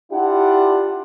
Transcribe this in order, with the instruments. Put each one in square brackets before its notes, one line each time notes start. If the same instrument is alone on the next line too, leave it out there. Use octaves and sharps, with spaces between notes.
[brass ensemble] D4 E4 F4 G4 F#5